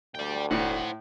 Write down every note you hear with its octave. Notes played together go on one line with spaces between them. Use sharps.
D2 D5 G5
E1 A2 C5 F#5